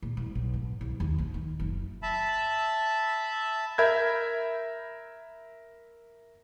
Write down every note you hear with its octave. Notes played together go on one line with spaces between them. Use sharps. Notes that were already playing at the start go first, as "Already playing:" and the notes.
A#2
C2
B1
G#2
C2
D#2
A#1
D#3
F#1
E5 A5 B5
A#4 E5 B5 G6 G#6